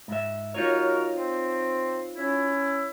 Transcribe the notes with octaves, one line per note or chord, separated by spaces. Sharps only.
G#2 E5
F#3 D#4 F4 F#4 A#4 C#5
C4
C#4 E4